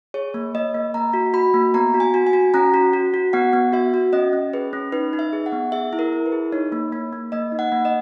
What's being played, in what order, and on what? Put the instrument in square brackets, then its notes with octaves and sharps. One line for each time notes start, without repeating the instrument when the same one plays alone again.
[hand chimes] G#4 C#5
A#3
A#3 D#5
A#3
A#3 A#5
F#4
F#4 B5
A#3
B3 A#5
F#4
G#5
F#4
G#5
F#4
C#4 A#5
F#4
F#4
F#4
B3 F#5
B3
F#4 E5
F#4
C#4 D#5
C#4
G#4 B4
C#4
D#4 B4
D#4
E5
G#4
F#5
B3
G#4 E5
E4
A#4
E4
B4
G#4
D#4 C#5
A#3
A#3
A#3
A#3 D#5
D#4
F#5
A#3
D#5